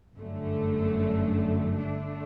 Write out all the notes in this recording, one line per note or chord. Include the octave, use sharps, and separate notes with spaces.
G1 F#2 D3 A3
D3 A3 D4